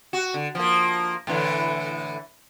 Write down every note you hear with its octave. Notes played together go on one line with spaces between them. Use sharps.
F#4
D3
F3 A#3
A2 D3 E3